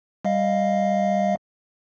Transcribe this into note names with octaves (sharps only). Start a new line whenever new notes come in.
G3 D#5 F5